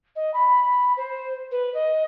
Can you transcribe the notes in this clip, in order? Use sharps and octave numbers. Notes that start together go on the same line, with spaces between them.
D#5
B5
C5
B4
D#5